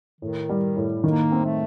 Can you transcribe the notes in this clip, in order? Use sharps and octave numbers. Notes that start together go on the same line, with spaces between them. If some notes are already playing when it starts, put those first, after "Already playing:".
A2 D#3
G3
A2
D#3 A#3
C4
A3